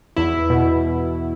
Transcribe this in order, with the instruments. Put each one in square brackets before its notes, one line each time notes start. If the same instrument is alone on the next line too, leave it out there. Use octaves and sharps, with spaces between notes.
[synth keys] E2 E4
B2